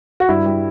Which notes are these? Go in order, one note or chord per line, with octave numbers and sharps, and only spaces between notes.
F#4
G2 E4
G3